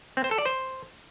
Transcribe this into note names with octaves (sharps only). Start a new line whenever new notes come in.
C4
C5
A4
D5
C5